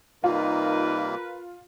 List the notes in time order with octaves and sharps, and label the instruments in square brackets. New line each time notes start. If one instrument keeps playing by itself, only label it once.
[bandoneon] C3 G3 A#3 [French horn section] D#4 [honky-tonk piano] F4 [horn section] A#4 B4